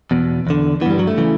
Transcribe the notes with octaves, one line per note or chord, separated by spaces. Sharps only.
E2 B2
E2 D3
G2 E3 G3 B3
F#3
A3
C#3 E3